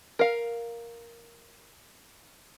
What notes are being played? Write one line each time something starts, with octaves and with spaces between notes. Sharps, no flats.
A#4 F5